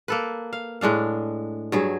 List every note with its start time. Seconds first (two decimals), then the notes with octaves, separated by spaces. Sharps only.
0.08 A#3 A4 B4
0.53 F5
0.81 A2 G#3 D4 F5
1.72 G2 F#3 G#4